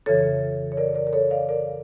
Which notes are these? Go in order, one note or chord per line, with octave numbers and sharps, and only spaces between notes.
F2 C#3 E3 A4 C#5
C#5
A#4 D5
A#4 D5
A#4
A4 C#5
D5 F5
A#4 D5